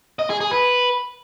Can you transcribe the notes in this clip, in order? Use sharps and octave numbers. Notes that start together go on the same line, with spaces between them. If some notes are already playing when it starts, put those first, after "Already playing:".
D#5
G#4
G#4
B4